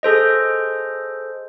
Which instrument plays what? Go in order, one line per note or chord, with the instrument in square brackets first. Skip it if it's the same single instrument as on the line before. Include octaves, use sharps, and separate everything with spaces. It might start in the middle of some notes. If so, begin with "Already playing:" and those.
[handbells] G#4 A4 C5 D#5